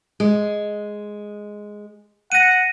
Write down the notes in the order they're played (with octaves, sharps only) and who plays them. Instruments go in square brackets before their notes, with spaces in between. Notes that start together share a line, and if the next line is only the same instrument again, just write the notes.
[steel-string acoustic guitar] G#3
[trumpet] F#5 [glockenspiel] A#6 D#7